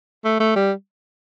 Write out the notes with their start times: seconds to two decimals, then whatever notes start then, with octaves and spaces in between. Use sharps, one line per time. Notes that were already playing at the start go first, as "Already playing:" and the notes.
0.25 A3
0.40 A3
0.56 G3